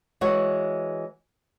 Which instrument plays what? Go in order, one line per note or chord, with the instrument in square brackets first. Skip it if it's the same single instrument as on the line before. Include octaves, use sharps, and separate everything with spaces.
[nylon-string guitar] E3 G#3 F#4 C#5